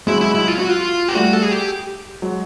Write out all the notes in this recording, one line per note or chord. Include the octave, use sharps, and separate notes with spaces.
F#3 G#3 E4
E4
E4
F4
F#4
F4
G4
G3 A3 F#4
A4
G#4
G4
F#3 G#3